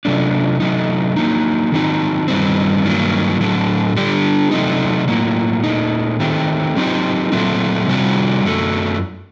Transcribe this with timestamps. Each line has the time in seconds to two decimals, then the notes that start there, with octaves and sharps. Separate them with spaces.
0.05 C3 F#3 A3 D4
0.60 C3 F#3 A3 D#4
1.16 F#3 A#3 D#4
1.72 D#3 F#3 C4 D#4
2.28 G2 D#3 G3 C4
2.84 G2 D#3 F#3 A#3
3.40 A2 F#3 A3
3.96 D3 G3 D4 G4
4.51 C3 F#3 A3 C4 D#4
5.08 A2 F#3 A#3 F#4
5.64 A#2 A3 D#4
6.20 D#3 A3 C4 G4
6.76 F#3 C4 D#4 G4
7.32 A#2 F#3 A3 C4
7.88 C3 G3 C4 F#4
8.44 F#2 F#3 A3